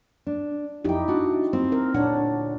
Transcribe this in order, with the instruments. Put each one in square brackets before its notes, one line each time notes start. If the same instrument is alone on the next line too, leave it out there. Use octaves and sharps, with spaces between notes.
[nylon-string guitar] D4
[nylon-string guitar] F2 G5 [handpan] D#4 E4 G4
[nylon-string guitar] D4 F#4
C4
[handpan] A#4
[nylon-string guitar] D2 C#5 F#5 [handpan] A#2 D4